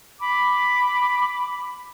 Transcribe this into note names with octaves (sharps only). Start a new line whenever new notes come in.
B5 D6